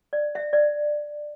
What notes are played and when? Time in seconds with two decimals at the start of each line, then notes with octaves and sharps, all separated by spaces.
0.13 D5
0.35 E5
0.53 D5